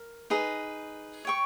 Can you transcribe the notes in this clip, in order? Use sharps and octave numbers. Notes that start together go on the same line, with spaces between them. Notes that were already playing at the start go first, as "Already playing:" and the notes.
Already playing: A#4
D#4 G#4 B4
C#5 G5 C#6